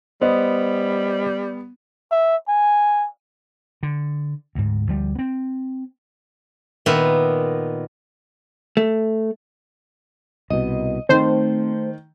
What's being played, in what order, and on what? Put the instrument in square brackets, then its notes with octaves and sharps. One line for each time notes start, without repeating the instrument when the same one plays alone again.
[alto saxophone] G3 [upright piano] B3 [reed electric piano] C5 D#5
[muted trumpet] E5
G#5
[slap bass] D3
D2 G#2
D2 F3 G3
B3 C4
[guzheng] A#2 D#3 B3 E5
[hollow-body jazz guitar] A3
[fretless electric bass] C2 B2 [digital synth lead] D#5
[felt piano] D#3 [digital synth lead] A3 [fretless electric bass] C4 [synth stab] C5